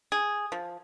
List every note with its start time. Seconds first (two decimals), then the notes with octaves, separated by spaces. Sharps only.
0.12 G#4
0.52 F3